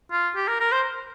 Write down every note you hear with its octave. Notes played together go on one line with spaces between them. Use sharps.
F4
G4
A#4
A#4
C5